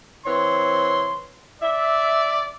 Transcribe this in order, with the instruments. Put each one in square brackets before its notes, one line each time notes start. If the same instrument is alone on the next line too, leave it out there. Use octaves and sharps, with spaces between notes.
[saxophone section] E3 C4 C#5 [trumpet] C6
[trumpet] D5 [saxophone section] E5